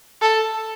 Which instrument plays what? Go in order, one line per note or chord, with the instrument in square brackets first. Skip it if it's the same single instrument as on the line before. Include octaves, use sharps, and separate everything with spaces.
[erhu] A4